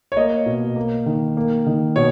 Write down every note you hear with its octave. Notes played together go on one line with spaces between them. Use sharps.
C#5
A#3 D#5
B2
A#3
D#3
A#3
D#3
B2 C#5